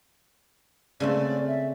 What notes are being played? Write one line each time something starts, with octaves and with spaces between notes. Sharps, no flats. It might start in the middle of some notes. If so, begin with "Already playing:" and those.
C#3 A3 C4 D5
E5